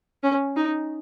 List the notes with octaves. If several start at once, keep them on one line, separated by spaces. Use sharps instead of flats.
C#4
D#4